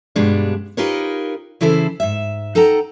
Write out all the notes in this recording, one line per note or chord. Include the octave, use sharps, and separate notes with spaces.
G2 B2 G3 G#3 D4
D#4 F4 G4 A#4 B4 C#5
C#3 E3 E4 A4 C5
G#2 E5
D#4 A4 F#5 G5 A#5